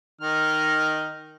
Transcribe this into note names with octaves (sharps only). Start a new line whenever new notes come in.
D#3 D#4 F6